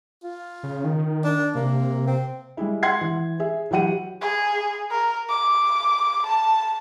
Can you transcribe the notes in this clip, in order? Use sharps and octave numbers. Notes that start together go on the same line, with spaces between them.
F4
C#3
D#3
D4
C3 A#3
C4
G3 G#3 E4
F#5 C6 G#6 C7
E3
G#4 E5
E3 F#3 G4 F#5 D#7
G#4
A#4
D6
A5